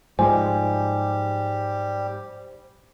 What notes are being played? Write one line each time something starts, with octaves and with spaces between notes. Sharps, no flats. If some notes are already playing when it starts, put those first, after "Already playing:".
G#2 F3 G3 G#3 G4 C5 G#5